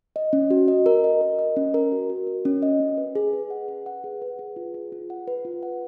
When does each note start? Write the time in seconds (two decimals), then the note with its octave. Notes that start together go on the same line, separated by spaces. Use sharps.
0.16 D#5
0.33 C#4
0.51 F#4
0.68 D#5
0.86 A#4
1.04 D#5
1.21 A#4
1.39 D#5
1.57 C#4
1.74 A#4
1.92 F#4
2.10 F#4
2.27 A#4
2.45 C#4
2.62 D#5
2.80 C#4
2.97 B4
3.15 G#4
3.33 B4
3.50 F#5
3.68 B4
3.86 F#5
4.04 G#4
4.22 B4
4.39 G#4
4.56 F4
4.74 G#4
4.92 F4
5.10 F#5
5.27 B4
5.45 F4
5.63 F#5